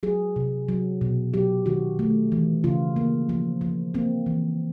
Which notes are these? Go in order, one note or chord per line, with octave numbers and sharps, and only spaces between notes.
F#3 G#4
C3
F#3
B2
F#3 G4
D#3 F#4
A3
E3
C#3 F4
A#3
F3
F3
A#3 C4
E3